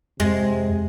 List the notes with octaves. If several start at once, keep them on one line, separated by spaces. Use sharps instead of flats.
F2 C3 G#3